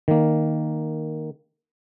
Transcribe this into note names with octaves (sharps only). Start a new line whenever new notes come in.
D#3 A#3